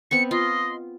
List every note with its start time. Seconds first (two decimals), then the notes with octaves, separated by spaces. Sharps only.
0.11 B3 C4 C#6 C#7
0.31 F4 D#5 C6